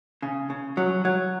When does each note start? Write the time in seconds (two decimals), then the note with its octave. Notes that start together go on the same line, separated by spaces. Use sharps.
0.22 C#3
0.50 C#3
0.77 F#3
1.05 F#3